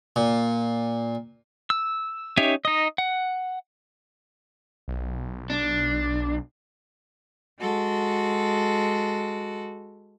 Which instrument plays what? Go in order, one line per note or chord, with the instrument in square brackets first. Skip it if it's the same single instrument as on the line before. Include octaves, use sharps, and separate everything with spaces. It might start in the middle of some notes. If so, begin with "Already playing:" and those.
[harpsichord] A#2
[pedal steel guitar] E6
C#4 D#4 G4 C#5 E5
D#4 D#5
F#5
[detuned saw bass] B1
[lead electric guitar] D4
[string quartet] G#3 F#4 A4